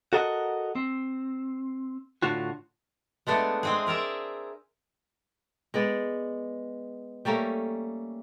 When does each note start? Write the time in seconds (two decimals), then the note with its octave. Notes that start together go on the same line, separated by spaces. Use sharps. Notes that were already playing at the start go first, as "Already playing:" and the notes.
0.13 F#4 A4 A#4 D#5 E5 F#5
0.75 C4
2.22 A2 D3 D4 F4 F#4
3.27 G#3 A3 B3 D4
3.63 G#3 C4 G#4
3.87 G#4 A#4 D5 E5
5.74 G#3 B3 D5
7.25 G3 A3 A#3 C#4